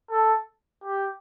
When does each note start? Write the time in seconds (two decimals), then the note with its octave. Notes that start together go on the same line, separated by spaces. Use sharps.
0.10 A4
0.84 G4